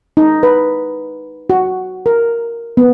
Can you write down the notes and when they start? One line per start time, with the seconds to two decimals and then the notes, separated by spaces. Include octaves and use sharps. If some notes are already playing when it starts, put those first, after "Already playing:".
0.17 D#4
0.43 B4
1.50 F#4
2.06 A#4
2.77 B3